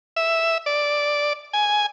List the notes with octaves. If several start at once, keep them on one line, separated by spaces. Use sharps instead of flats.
E5
D5
G#5